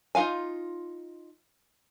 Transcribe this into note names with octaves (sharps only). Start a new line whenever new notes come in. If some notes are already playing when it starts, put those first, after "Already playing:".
D#4 F4 F5 G#5